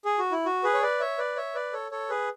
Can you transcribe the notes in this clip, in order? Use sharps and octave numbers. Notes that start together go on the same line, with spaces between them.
G#4
F#4
E4
F#4
G#4 B4
C#5
B4 D5
C#5 E5
B4 D5
C#5 E5
B4 D5
A4 C#5
A4 C#5
G#4 B4